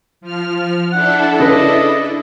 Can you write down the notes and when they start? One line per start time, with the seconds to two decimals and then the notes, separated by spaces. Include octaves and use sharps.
0.21 F3 F6
0.92 D4 E4 A4 F#5
1.40 C#3 B4 D#5